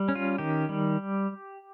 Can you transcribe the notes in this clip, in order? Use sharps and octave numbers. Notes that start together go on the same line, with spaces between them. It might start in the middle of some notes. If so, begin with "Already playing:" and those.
Already playing: G3
C#4
F4
D#3 G4
G3